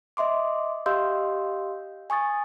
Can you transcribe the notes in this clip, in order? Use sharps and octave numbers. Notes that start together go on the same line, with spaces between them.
D#5 E5 C6 D6
G4 D#5 F5 C6 E6 G6
G#5 C#6 D#6 A6